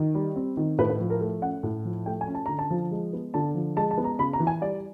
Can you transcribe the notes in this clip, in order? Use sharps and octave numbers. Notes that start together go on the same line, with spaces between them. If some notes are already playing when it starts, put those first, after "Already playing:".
Already playing: D#3
G3
C4
D#3
A2 B4
B4
F3
A#4
A3
C#4 F#5
A2
F3
A3 G5
G#5
C#4
A5
D3 A#5
A5
F3
G#3
B3
D3 A5
F3
G#3 A5
A5
B3
A#5
C#3 B5
A#5
E3
G#5
G3 D5